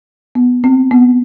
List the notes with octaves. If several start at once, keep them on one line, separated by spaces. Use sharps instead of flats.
B3
C4
B3